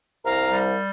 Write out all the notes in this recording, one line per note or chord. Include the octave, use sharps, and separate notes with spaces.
C2 F5 A#5
G3